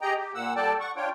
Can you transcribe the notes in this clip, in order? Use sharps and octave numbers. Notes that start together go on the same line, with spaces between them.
G4 G#4 D#5 G5 A#5
G4
A#2 A#3 F#5 E6
G3 A4 D5 G5 A5
F#5 C#6
D4 F4 C#5 G5